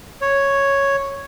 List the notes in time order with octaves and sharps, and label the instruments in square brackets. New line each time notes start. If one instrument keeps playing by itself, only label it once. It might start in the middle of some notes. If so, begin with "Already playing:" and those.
[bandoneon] C#5